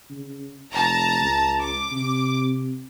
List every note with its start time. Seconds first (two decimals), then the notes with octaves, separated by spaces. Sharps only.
0.10 C#3
0.72 F1 A5 A#5
1.21 C#2
1.60 D6
1.92 C3